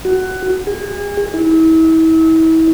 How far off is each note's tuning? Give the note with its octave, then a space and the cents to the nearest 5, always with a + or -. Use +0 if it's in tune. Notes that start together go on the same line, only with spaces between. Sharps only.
F#4 +15
G#4 -35
E4 -35